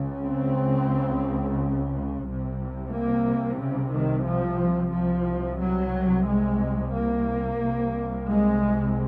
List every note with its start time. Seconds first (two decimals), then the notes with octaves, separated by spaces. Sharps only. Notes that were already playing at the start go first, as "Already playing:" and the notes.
Already playing: C#2 C#3
0.24 C4
2.24 C2 C3
2.91 A#3
3.59 C#3
3.92 D#3
4.26 F3
4.92 C2 C3 F3
5.60 F#3
6.26 G#3
6.93 A#3
7.60 C2 C3
8.28 G#3